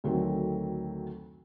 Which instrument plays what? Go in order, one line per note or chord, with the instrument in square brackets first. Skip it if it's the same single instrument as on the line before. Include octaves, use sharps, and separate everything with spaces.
[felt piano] D2 D#3 F#3 A3 C4